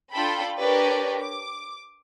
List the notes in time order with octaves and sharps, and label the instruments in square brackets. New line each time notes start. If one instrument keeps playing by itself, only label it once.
[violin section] D4 F4 A4 G5 B5
D4 G4 A#4 B4 C#5 D5
D6